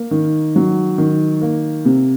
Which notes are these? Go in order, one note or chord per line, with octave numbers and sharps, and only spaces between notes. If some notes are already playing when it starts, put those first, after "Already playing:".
Already playing: A#3
D#3
F#3
D#3
A#3
C3